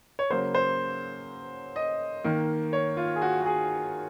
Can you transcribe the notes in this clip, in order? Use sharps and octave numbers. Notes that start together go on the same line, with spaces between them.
C#5
C#3 F#3 A#3 C5
C5
D#5
D#3 A#3
C#5
F4
G#4
F#4
F#4
G#4